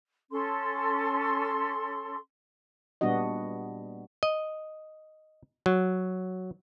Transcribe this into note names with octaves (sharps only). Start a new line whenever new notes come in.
C#4 A4 C6
A#2 G3 B3 D4 F#4 D#5
D#5
F#3